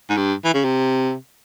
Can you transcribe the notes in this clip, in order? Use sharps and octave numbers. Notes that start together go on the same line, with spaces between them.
G#2
G2
E3
C#3
C3